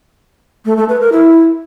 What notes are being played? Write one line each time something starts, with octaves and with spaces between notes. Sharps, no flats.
A3
A3
B4
A#4
E4